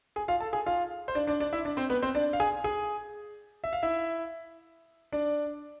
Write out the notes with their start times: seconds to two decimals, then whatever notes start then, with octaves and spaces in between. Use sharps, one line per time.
0.16 G#4 G#5
0.28 F4 F5
0.40 A4 A5
0.53 G#4 G#5
0.66 F4 F5
1.08 C5
1.15 D4 D5
1.27 D4 D5
1.40 D4 D5
1.53 E4 E5
1.65 D4 D5
1.77 C4 C5
1.90 B3 B4
2.02 C4 C5
2.15 D4 D5
2.33 F5
2.40 G#4 G#5
2.64 G#4 G#5
3.64 E5
3.73 F5
3.83 E4 E5
5.12 D4 D5